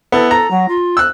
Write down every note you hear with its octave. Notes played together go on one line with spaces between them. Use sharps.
B3 E4 A4
A4 A#5
F#3
F4
E6 F#6